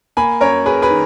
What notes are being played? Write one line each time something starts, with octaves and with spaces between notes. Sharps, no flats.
A#3 G#5 B5
F#2 A#4 C#5
C#4 G#4 B4
G#4 B4
D#3